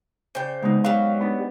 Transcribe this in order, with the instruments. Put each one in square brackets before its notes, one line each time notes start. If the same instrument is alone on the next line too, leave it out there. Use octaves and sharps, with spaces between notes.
[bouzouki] C#3 G5 [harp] C5 D5
[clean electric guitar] C#2 [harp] G#3 B3 D#4
[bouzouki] F#3 G3 [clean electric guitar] F5
[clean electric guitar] B3 [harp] D4 D#4